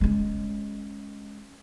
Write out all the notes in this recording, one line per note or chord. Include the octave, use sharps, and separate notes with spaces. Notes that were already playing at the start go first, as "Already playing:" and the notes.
G#3 C#4